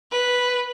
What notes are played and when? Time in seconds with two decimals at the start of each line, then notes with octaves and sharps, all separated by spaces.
0.11 B4